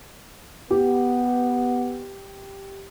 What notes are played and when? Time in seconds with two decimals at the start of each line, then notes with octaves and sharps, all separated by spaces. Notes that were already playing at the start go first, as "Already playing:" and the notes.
0.71 B3 G4